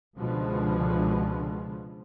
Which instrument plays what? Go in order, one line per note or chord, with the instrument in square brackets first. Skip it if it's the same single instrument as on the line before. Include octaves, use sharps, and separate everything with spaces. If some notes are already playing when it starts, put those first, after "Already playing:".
[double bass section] C#2 B2 D3 F3 G#3